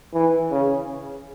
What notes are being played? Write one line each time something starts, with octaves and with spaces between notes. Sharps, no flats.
E3
C#3